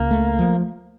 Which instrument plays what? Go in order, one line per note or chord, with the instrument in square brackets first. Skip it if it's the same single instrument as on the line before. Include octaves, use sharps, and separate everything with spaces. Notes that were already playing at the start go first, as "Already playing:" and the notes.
Already playing: [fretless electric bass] C#2 [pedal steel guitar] A#3
[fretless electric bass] A3
F3